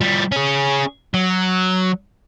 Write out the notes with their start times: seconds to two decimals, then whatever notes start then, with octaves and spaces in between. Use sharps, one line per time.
0.01 F3 G3
0.32 C#4 G#4
1.14 F#3